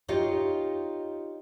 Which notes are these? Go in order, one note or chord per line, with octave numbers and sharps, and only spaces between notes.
D#4 F4 G4 C#5 D#5 F5